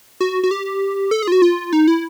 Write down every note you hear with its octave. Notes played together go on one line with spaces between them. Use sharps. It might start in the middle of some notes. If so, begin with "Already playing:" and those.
F#4
F#4
G4
A4
G#4
F4
F#4
F4
D#4
E4